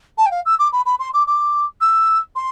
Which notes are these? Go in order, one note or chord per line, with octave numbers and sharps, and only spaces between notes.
A5
G5
F5
E6
D6
B5
B5
C6
D6
D6
E6
C6